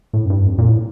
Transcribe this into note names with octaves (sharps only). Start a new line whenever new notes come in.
A2
F#2
G2
F2
A#2
A2